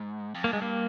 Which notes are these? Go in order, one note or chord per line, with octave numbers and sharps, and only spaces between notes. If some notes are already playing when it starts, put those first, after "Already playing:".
Already playing: G#2
F2
G2 A#3
G#3
A#3